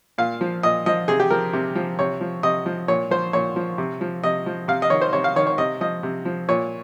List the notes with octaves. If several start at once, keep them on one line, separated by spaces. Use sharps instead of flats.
A#2 F5
F3
A#2 D#5
F3 D#5
C3 G#4
G4
F3 A#4
C3
F3
C3 C#5
F3
C3 D#5
F3
A#2 C#5
F3 C5
A#2 C#5
F3
C3
F3
C3 D#5
F3
C3 F5
D#5
D#3 C#5
C5
C3 C#5
F5
D#3 C#5
C#5
C3 D#5
F3 D#5
C3
F3
A#2 C#5